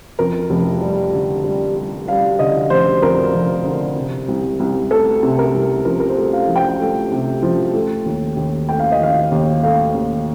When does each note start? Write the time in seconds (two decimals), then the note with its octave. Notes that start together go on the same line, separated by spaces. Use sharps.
0.19 F2 A#4
0.50 F1
0.81 G3
1.13 D3
1.44 G3
1.76 G3
2.08 G3 F5
2.39 D3 D#5
2.70 F1 C5
3.02 F2 A#4
3.34 F1
3.49 A#4
3.65 D3
3.96 C3
4.28 C2
4.60 C2
4.91 A3 A4
5.23 C3
5.39 A#4
5.54 C2
5.85 F3 A#4
6.00 A#4
6.09 C5
6.17 A3
6.33 F5
6.48 F3
6.56 G5
6.80 A3
7.12 C3
7.43 F3
7.74 A3
8.05 D#2
8.37 D#2
8.69 A3 G5
8.79 F5
8.92 D#5
9.00 D#3 F5
9.32 D#2
9.62 A3 F5
9.94 D#2